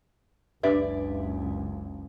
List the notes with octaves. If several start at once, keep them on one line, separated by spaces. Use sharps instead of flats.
F#1 C#2 D4 G4 B4 D5 E5